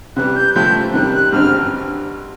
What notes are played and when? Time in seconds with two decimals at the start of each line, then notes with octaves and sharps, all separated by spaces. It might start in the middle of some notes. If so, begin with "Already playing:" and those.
0.16 C3 E3 G3 F#6
0.36 G6
0.55 C3 F3 A3 C4 G6
0.94 C3 D#3 G3 F#6
1.13 F#6
1.32 G#1 G2 D3 G3 C4 F6